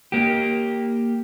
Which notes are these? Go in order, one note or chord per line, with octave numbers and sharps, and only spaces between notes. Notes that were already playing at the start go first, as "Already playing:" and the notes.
A#3 G4